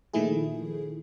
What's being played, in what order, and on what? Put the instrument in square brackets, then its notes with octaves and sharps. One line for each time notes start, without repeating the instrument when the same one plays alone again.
[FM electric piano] A#2 D#3 F3 A3 E4 G#4